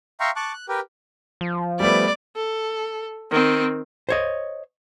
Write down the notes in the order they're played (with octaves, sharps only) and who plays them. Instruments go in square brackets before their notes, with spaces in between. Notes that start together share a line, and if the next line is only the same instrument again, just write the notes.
[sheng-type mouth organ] E5 F5 G5 A#5 C6 C#6
A5 C#6 D6 F#6
F#6
G4 A#4 B4 G5
[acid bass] F3
[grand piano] G3 A3 B3 [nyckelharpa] D5
[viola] A4
D#3 C4
[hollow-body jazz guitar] C5 C#5 D#5